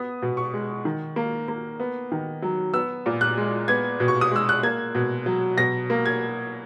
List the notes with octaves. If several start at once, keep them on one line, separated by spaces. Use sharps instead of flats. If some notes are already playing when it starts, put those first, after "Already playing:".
Already playing: B3 D#6
B2
C#6
G#3
D#3
A#3
A#3
B3
D#3
F#3
B3 E6
A#2
F#6
G#3
B3 G#6
B2
C#6
D#6
G#3 E6
F#6
A#3 G#6
B2
F#3
B2 A#6
A#3
G#6